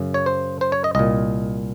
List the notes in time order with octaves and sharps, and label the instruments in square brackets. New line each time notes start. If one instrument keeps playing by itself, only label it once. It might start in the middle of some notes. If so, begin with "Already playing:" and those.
Already playing: [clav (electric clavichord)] F#2 C#3
C#5
C5
C5
C#5
D#5
C2 A#2 D#5